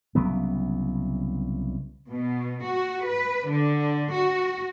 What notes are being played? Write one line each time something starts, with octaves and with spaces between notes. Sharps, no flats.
C2 C#3 F#3 B3
B2
F#4
B4
D3
F#4